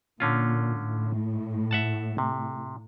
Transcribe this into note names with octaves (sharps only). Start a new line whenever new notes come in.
A#2 D3 C#4 F4
A2
E5 F#5 A5
C3